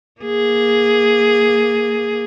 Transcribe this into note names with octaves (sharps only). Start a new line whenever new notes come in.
A#3 G#4